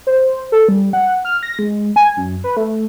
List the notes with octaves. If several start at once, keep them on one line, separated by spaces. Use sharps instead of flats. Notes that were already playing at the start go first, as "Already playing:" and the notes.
C5
A4
G3
F#5
F6
A#6
G#3
G#5
F#2
B4
A3